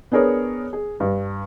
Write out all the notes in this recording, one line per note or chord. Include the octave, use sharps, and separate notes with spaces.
B3 D4 G#4 A#4 C#5
G#4
G2